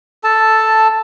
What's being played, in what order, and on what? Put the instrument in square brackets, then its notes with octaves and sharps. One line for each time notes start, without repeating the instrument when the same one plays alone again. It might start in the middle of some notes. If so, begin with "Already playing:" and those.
[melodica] A4 A5